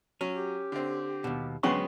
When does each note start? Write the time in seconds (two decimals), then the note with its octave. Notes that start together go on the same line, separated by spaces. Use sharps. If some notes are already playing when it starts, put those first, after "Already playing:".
0.21 F#3 C#4
0.33 G4
0.72 D3 C4
1.24 D#2 B2
1.63 D2 F#3 G#3 B3 C#4 G#5 C6 C#6